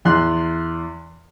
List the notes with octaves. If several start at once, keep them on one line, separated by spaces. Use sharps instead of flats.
E2 C6 F#6